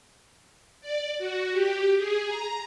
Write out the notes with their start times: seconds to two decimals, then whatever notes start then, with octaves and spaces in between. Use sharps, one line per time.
0.81 D5
1.18 F#4
1.52 G4
1.97 G#4
2.28 A#5